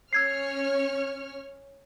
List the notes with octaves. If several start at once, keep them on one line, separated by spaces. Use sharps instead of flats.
C#4 C#5 E6 F6 G#6 C7